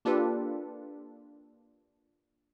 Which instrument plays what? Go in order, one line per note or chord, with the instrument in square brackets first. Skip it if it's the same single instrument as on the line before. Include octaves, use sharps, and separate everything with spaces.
[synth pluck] A#3 D4 F4 G4 A4 B4